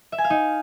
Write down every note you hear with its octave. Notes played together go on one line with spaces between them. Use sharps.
E5
G#5
F5
D#4